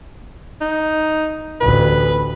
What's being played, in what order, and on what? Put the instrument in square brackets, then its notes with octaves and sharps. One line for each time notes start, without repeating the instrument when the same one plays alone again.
[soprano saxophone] D#4
[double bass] A1 D2 [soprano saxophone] B4